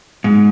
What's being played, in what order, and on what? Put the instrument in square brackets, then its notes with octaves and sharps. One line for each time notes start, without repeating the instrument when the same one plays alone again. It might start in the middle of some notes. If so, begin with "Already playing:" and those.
[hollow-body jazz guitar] G#2